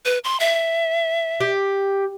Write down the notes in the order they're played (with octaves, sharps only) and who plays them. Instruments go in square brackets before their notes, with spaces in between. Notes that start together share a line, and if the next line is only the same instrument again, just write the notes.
[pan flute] B4
C6
E5
[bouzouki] G4